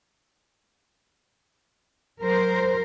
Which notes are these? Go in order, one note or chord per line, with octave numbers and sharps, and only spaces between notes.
F#3 A#4 C5